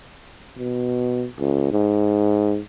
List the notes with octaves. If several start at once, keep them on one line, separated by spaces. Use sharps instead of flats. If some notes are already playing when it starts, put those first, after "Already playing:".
B2
C#2
G#2